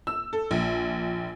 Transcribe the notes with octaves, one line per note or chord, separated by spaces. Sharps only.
E6
A4
A#1